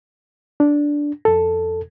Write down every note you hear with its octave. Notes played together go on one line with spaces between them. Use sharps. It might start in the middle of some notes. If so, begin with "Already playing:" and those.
D4
F2 A4